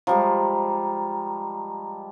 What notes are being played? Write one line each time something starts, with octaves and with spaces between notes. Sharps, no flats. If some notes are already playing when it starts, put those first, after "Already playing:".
F3 G3 G#3 A#5